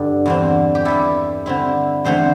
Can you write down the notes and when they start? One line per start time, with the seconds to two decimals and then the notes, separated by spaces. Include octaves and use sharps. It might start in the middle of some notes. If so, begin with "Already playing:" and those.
Already playing: G2 D3 G3 D4 G4 A4
0.26 E2 D3 C4
0.75 G4
0.85 G2 G3 E4 A4
1.46 D3 C4 E4
2.04 E2 D3 A3 C4 C5